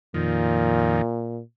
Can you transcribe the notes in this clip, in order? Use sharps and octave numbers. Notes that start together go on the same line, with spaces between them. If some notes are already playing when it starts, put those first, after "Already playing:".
F2 A#2 D#3